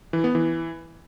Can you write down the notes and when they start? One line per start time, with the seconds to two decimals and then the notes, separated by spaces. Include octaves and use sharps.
0.13 E3
0.24 B3
0.35 E3